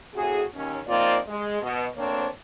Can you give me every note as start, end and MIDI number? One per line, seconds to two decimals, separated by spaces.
0.15 0.43 45
0.15 0.43 48
0.15 0.43 66
0.15 0.43 68
0.55 0.79 39
0.55 0.79 61
0.87 1.17 53
0.87 1.17 58
0.87 1.17 60
0.87 1.17 63
0.87 1.17 65
0.87 1.17 74
1.28 1.61 56
1.62 1.86 47
1.62 1.86 75
1.97 2.27 38
1.97 2.27 58
1.97 2.27 60
1.97 2.27 62
1.97 2.27 72
1.97 2.27 73